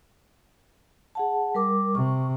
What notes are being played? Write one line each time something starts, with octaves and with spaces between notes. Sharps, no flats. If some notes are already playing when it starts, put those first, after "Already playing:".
G#4 F#5 A5
G3 A#4 D6
C3 C#6